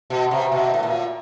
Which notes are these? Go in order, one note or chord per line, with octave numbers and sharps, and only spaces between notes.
B2
C3
B2
A2
A#2